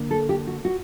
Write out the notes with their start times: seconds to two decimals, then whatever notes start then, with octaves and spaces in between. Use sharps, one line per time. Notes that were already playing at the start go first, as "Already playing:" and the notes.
Already playing: D3 A#3
0.11 A4
0.29 G4
0.47 F#4
0.65 F#4